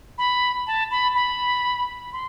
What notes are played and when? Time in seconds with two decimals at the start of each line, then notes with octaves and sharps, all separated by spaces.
0.18 B5
0.67 A5
0.91 B5
1.15 B5
2.13 C6